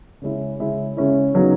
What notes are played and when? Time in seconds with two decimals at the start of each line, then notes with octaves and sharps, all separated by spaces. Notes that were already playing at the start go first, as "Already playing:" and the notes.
0.22 C#3 G#3 C#4 E4
0.59 C#3 G#3 C#4 E4
0.97 C#3 G#3 C#4 E4
1.34 C#3 F#3 B3 D#4